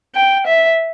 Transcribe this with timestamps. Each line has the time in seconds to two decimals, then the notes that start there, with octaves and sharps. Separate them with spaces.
0.16 G5
0.47 E5